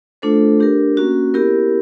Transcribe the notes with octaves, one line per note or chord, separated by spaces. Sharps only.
A3 D4 F4 A4 C5
D4 G4 A#4
A#3 C#4 F#4
B3 E4 G4 A#4